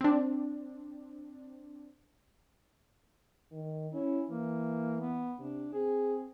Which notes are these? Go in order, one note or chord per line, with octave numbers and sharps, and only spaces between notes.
C4 D4
D#3
C#4 E4
E3 A#3
B3
C3 D4
C4 G#4